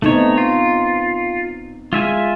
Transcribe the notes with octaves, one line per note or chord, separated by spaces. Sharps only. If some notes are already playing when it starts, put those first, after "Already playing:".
A3 B3 C4 D#4 C#5
F4
G#3 F4 E5 G#5